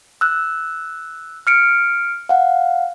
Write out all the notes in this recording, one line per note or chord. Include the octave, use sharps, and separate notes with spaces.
E6 F#6
F6 C#7 D7
F5 F#5